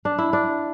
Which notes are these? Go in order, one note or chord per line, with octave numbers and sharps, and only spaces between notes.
D4
E4
D4